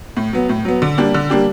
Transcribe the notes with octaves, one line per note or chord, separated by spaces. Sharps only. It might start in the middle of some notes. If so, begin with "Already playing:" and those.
A2
F#3 B3
A2
F#3 B3
D3
G3 A#3 D4 G4
D3
G3 A#3 D4 G4